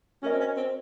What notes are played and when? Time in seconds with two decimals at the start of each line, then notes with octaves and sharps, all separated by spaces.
0.23 C#4 F#4 A#4 D#5
0.32 C4
0.40 C#4
0.57 C4